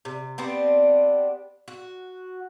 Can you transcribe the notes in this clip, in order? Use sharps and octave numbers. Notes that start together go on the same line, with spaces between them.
C3
B3 C4 D4 G4
F#4